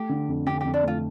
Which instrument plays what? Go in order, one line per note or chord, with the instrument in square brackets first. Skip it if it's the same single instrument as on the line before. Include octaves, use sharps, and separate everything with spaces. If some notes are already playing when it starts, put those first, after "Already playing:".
Already playing: [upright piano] A3 [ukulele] G4
[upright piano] D3
F2
[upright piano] D3 [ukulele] G4
[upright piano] F2 [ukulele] G4
[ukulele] D4
[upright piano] A3 [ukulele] F4